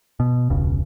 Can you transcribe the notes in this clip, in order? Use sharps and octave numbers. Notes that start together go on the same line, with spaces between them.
B2
E1 C#2 C#3